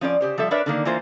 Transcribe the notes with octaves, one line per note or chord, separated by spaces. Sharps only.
F3 C#4 D4 D5
C#3 G4 C5
F3 G3 A4 E5
D4 A#4 B4 C#5 D5 E5
D3 D#3 A#3
E3 A#3 F4 C5